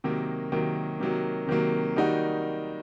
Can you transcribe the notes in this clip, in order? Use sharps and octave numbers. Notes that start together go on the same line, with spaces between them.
C3 D#3 F#3 A#3
C3 D#3 F#3 A#3
C3 D#3 F#3 A#3
C3 D#3 F#3 A#3
D#3 G3 A#3 D#4 F#4